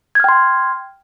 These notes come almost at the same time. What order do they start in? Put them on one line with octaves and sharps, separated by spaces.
G#6 F6 G5 C6